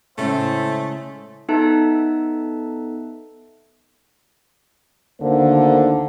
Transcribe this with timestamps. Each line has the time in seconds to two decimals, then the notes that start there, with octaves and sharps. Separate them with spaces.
0.18 A2 C#3 G#3 A3 C5 E5
1.49 B3 D#4 A4 E5 A5 F#6
5.21 D2 D3 D#3 A#3 C5